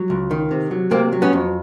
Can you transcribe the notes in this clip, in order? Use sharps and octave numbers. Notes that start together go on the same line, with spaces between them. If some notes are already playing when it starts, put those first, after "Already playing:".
Already playing: F#3
C#2
D#3
C3
F#3
C3 A#3 C4
F#3
B3 C#4
F2